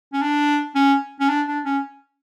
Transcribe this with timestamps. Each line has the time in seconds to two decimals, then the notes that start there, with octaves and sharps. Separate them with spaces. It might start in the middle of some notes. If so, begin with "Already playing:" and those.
0.13 C#4
0.22 D4
0.75 C#4
1.20 C#4
1.29 D4
1.47 D4
1.65 C#4